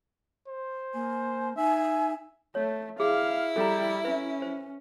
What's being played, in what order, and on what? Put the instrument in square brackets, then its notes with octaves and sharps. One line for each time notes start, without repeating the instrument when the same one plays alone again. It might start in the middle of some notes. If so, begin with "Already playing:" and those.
[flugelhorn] C5
[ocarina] A#3 [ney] G#5
[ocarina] D#4 [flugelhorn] E5 [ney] G#5
[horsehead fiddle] A3 [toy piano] C#5
[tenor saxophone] E4 [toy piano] G#4 [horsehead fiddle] F5
[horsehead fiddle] G3 [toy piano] A4 A#5
[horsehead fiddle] C#4 [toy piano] B4 E5
[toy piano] C5